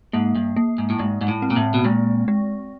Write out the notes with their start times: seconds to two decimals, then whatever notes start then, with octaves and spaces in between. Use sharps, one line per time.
0.13 G#2 A#3
0.35 G2
0.57 A#3
0.78 G#2
0.90 A2
0.99 G#2 G#3
1.21 G#2
1.28 A2
1.42 C4
1.50 A#2
1.56 A2
1.74 B2
1.85 A#2 G#3
2.28 G#3